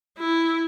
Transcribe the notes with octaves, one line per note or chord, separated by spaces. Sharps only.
E4